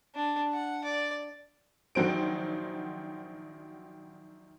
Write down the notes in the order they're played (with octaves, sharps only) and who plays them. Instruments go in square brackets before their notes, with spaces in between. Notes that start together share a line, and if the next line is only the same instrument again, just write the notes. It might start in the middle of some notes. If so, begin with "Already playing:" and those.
[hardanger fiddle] D4
F#5
D5
[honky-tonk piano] A#1 D#3 F#3 C5 D7